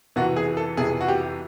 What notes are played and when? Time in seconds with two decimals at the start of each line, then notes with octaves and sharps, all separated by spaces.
0.16 F2 C3 E3 F#4
0.36 G#4
0.57 A4
0.77 F2 C3 E3 G#4
1.01 F#4
1.08 G4